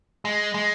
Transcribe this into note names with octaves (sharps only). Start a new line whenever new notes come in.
G#3
G#3